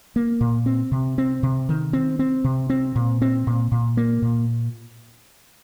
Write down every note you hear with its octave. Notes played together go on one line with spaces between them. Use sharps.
A#3
A#2
C4
C3
C4
C3
D#3
C4
C4
C3
C4
A#2
C4
A#2
A#2
A#3
A#2